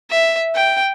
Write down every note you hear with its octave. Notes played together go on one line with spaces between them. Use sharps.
E5
G5